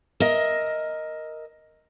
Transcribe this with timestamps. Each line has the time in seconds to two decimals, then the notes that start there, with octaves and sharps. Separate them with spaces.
0.20 A#4 D#5 E5